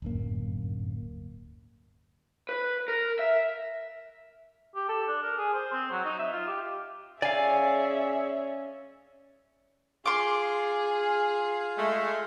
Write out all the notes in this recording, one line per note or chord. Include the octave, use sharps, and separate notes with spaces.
D1 G1 F#2 A#3
B4
A#4
E5
G4
A4
D4
A#4
G#4
C5
C4
F#3
D#4
E5
F4
G4
C#4 G#4 C#5 D5 E5 F5 G#5
F4 G#4 F5 C6 D6
G#3 A3